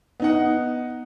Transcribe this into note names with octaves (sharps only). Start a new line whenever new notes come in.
B3 D#4 F#5